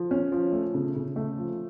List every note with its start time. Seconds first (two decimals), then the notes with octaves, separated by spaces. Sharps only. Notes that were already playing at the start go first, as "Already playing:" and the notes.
Already playing: F3
0.11 C#4
0.32 F3
0.53 A3
0.74 C#3
0.96 C#3
1.16 A3
1.38 F3